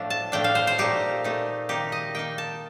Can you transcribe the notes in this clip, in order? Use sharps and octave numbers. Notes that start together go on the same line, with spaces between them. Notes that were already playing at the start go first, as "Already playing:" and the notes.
Already playing: A2 F3 A3 D4
A5
A2 F3 A3 D4 G5
F5
C5
C5
A#2 A3 D#4 G4
A#2 A3 D#4
D#3 A#3 D#4 G4
D#5
D#3 A#3 D#4 G5
A5